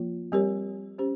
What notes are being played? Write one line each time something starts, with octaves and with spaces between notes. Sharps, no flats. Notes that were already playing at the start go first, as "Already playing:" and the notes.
Already playing: F3 A#3 F4
G3 C4 G4 A#4 C#5
C#4 G4 C5